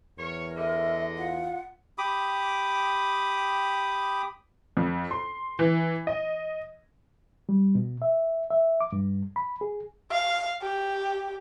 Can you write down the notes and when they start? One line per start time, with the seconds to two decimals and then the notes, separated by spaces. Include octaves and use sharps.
0.18 E2 A#4 C#5
0.57 D3 G#3 D#5 E5
1.17 F4 F#5
1.98 G4 B5 D6 D#6
4.77 F2
5.11 C6
5.59 E3
6.07 D#5
7.49 G3
7.75 B2
8.02 E5
8.50 E5
8.81 D6
8.92 G2
9.36 B5
9.61 G#4
10.11 F5
10.62 G4